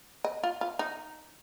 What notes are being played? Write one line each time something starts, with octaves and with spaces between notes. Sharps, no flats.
D#5
F4
F4
D#4